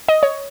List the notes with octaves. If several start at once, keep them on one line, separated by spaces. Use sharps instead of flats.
D#5
C#5